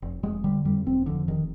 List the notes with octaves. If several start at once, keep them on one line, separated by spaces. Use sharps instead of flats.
F1
F1 G#3
D3 G3
F2 G3
F1 C4
F2 D3
F1 D#3